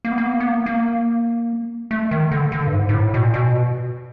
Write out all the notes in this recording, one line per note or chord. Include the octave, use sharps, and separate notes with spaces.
A#3
B3
A#3
B3
A#3
B3
A#3
A#3
A3
D#3
D3
D3
G2
G#2
G#2
A2
B2
A#2
B2